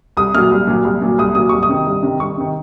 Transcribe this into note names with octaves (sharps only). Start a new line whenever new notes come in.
C2 D#6
A#2 F#3 F6
C2
A#2 F#3
C2
A#2 F#3
C2 D#6
A#2 F#3 D#6
C2 C#6
D#6
C3 D#3
C2
C3 D#3
C2 C#6
C3 D#3